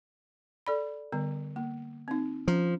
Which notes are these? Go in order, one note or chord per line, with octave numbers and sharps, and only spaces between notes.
A4 D5 B5
D3 G3 B3
A#3
C4 D#4
F3 C#4